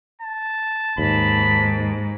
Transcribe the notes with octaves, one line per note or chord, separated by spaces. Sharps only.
A5
D#2 G#2 B5